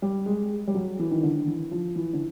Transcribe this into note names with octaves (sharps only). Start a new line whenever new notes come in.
G3
G#3
G3
F#3
E3
D#3
D3
E3
F3
E3
D3